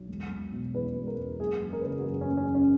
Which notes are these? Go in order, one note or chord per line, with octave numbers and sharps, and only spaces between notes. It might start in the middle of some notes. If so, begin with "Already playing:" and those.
Already playing: B1
E1
E1
B2
E2 B4
E1
A#4
E1
F#1 G#4
F#1
A#4
B4
C#3 A#4
F#4
F#2 G#4
C#4
F#1
C#4
F#1
C#4